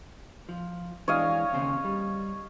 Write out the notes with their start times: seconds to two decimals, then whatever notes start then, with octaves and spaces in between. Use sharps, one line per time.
0.49 F3
1.08 E3 G#3 D4 C#5 D#5 F5
1.53 D#2 C#3 C4
1.85 G3